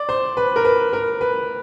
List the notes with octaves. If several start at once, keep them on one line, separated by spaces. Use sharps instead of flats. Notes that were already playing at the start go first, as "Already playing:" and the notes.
Already playing: D5
C5
B4
A#4
B4
A#4
B4